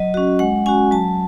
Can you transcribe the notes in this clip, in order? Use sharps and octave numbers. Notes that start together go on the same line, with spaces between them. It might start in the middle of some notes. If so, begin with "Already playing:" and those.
Already playing: F#3 D#5
C#4 F#4
G#3 F#5
C#4 F#4 G#5
F#3 A5